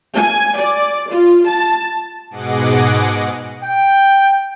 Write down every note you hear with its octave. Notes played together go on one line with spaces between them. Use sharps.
G#5
D5
F4
A5
G#2 B2 G#4 D#5 F#5 D6
G5